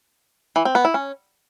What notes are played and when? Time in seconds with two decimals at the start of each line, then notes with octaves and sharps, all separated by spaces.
0.56 E3
0.65 C4
0.75 B3
0.85 E4
0.94 C#4